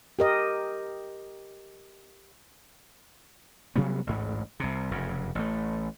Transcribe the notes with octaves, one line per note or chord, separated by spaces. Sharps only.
G4 A#4 D#5
C3 F#3 G3 B3
A1 D2 G#2
C2 C3
F1 F#2 C#3
A1 A3